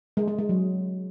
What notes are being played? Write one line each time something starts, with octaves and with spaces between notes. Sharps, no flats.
G#3
G#3
G#3
F#3